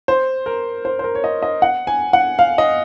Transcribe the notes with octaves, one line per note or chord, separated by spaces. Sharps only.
C5
A#4
C5
C5
A#4
C#5
D#5
D#5
F#5
G#5
F#5
F5
D#5